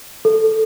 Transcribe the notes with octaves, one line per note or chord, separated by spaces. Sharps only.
A4